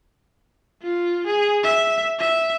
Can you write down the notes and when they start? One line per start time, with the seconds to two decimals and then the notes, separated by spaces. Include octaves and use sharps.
0.82 F4
1.27 G#4
1.64 E5
2.19 E5